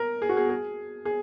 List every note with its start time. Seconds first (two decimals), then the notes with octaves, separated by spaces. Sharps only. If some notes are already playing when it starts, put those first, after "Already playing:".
Already playing: A#4
0.22 G#4
0.29 F#4
0.37 G#4
0.50 G#4
1.05 G#4